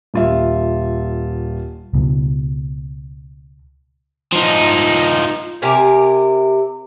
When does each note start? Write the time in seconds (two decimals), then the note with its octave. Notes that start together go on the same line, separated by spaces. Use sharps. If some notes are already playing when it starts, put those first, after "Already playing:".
0.14 D#1 F4 E5
1.94 C#2 B2
4.32 F3 D#4
5.62 C3 G4 A#4 G#5